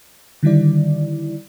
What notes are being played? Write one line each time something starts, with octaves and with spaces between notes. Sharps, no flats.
D3 D#3 G3 E4 D5